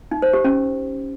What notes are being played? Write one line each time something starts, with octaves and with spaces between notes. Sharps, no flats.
D#4
C5
G4
C#4